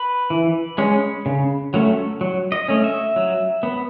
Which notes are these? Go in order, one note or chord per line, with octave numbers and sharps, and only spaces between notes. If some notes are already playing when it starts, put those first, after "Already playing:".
Already playing: B4
E3
G#3 C#4
C#3
F#3 A3 C#4
F#3
D#5
A3 C#4
E5
F#3
B3